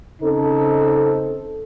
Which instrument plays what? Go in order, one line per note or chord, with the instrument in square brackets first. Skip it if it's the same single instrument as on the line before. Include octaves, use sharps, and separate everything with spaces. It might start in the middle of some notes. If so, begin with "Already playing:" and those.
[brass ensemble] C#3 C4 D#4 A4